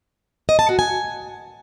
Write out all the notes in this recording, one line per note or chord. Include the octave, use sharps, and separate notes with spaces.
D#5
A5
F#4
G#5